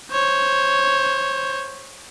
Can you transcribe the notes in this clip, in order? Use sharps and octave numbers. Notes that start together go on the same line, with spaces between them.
C5 C#5